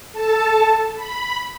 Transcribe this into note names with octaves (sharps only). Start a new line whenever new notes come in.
A4 A5
B5